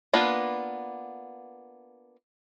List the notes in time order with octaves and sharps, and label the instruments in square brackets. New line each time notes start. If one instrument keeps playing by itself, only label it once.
[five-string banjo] A#3 B3 D4 F4 B4